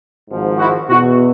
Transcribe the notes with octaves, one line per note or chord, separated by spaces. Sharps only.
G#1 G#2 F3
E4 F#4
B2 E4 F#4
E2